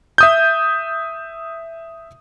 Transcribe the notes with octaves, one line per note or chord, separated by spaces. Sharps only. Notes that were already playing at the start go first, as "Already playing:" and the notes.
E5 D#6 G6